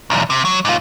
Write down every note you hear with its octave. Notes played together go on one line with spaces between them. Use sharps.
B1 E2
C3
F#3
G#2 F4